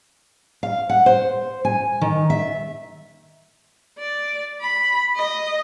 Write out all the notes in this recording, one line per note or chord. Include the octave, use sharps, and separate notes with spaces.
F5
F#5
C5
G#5
D#3
E5
D5
B5
D#5